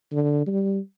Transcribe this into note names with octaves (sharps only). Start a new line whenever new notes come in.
D3
G3